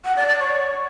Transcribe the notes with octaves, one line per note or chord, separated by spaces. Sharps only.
F#5
D5
D5
C#5